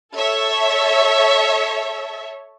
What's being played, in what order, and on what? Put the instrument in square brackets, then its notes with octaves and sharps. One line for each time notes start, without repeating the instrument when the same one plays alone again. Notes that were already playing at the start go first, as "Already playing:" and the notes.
[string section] A4 C#5 E5